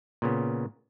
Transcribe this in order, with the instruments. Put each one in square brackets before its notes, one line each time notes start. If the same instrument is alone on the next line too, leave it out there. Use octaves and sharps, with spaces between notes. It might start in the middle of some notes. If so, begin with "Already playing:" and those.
[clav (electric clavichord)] A#2 C#3 B3